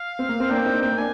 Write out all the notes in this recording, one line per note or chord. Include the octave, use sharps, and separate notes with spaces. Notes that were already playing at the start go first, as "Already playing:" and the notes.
Already playing: F5
C4
A#3
C4
A#3 D4 G5
C4 D#4
D4
C4 G5
A#3
D4 G#5